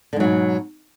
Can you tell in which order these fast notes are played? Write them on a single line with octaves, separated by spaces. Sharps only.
D3 G#2 F#3 B2